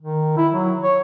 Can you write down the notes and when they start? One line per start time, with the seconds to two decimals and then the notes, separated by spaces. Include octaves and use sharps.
0.02 D#3
0.37 E4
0.53 F#3
0.83 C#5